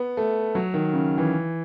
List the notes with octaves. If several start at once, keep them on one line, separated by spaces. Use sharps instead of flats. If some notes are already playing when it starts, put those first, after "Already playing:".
Already playing: B3
A3
F#3
D#3
C#3
E3